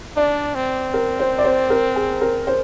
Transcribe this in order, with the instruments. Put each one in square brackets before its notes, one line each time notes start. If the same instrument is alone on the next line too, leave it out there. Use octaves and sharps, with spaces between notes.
[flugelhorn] D4 [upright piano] D5
[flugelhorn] C4
[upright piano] A#4
C5
D5
C5
A#4
G#4
A#4
C5